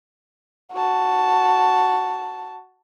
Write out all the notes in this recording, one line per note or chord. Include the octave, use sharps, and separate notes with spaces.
F#4 A5